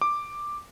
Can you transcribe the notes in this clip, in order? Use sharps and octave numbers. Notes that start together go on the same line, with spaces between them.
D6